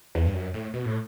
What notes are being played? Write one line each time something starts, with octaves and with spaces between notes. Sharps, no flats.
E2
G2
F#2
A2
B2
A2